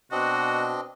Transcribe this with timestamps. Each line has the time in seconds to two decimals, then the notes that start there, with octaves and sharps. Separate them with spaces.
0.12 B2 C4 D4 F#4 D#5